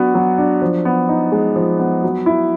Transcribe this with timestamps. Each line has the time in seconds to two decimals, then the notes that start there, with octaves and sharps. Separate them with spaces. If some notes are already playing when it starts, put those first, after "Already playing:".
Already playing: F#3 B3 D4 F#4
0.15 F#3
0.38 D4
0.62 F3
0.85 B3
1.09 D#4
1.32 G#3
1.56 F3
1.79 B3
2.04 F#3
2.26 E4